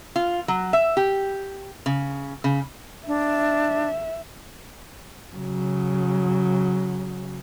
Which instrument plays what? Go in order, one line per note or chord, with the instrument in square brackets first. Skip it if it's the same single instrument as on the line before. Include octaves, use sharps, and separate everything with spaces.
[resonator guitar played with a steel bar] F4
F#3
E5
G4
C#3
C#3
[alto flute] D4 [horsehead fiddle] E5
[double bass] C#3 F#3